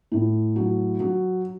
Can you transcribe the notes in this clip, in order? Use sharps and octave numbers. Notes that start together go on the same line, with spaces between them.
A2
F#3
F#3